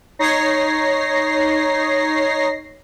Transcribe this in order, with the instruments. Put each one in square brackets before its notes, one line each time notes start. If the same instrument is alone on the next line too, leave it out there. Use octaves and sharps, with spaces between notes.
[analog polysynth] D#4 C#5 A#6 C7